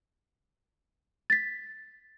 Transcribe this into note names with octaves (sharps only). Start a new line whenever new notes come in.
A6 B6